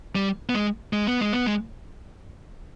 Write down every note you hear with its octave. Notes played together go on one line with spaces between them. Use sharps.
G3
B3
G#3
G#3
B3
G#3
B3
G#3